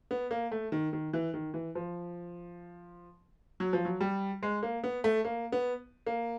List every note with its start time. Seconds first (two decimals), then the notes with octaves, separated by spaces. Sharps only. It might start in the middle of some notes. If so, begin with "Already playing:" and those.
0.11 B3
0.31 A#3
0.51 A3
0.72 D#3
0.93 D#3
1.13 E3
1.34 D#3
1.54 E3
1.75 F3
3.60 F#3
3.73 F3
3.85 F#3
4.01 G3
4.43 G#3
4.63 A#3
4.84 B3
5.04 A3
5.25 A#3
5.52 B3
6.06 A#3